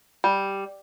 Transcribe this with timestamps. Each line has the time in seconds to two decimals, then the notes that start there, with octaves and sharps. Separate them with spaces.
0.24 G3